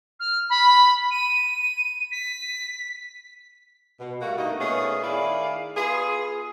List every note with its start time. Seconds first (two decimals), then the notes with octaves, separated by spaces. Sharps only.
0.19 F6
0.49 B5
1.10 D#7
2.11 B6
4.00 B2
4.22 G3 A3 A#3 F#4
4.38 G2 A3 A#3 D#4
4.59 A#2 A3 B3 C#4 G#4
5.03 D#3 E4 G#4 D5 F5
5.76 B3 F4 G#4